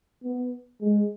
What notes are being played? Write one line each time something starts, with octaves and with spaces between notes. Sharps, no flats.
B3
G#3